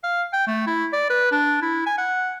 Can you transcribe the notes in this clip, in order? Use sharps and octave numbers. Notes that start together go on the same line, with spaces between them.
F5
G5
A3
E4
D5
B4
D4
E4
G#5
F#5